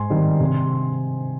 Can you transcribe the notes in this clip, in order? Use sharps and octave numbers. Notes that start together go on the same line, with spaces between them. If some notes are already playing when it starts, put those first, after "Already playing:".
Already playing: G#2 G#5 C6
D#3 G3 C4 D#4
C3